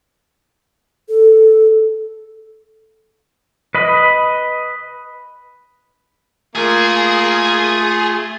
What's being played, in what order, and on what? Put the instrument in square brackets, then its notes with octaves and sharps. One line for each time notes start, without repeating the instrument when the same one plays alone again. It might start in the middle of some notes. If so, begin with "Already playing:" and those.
[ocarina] A4
[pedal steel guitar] B4 D#5 B5
[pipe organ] A3 F4 [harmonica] A#3 [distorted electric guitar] G#4